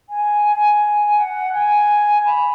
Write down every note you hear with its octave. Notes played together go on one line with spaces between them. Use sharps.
G#5
G#5
F#5
G#5
B5